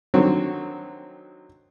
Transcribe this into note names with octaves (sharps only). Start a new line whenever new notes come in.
D3 D#3 F#3 C4